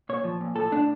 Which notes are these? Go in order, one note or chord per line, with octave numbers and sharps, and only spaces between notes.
A#2 C#5
F3
A#2
A2 A4
A2 D4